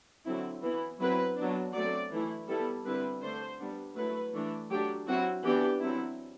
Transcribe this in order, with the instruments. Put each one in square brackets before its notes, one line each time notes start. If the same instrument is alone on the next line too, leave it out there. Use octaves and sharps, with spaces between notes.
[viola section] D3 F#3 C4 E4
E3 B3 E4
F#3 C4 E4 B4
F#3 B3 D4
F#3 A3 C4 D5
E3 A3 E4
G3 B3 E4 A4
D3 G3 C4 E4 B4
D3 A3 D4 C5
G3 B3 D4
F#3 A3 E4 B4
E3 A3 D4
F#3 A3 D4 G4
F#3 C4 E4 F#4
E3 B3 D4 G4
F#3 C4 E4